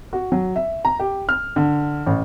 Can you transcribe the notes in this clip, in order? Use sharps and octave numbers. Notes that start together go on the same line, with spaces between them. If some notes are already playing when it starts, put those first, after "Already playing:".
F#4
F#3
E5
A#5
G4
F6
D3
A1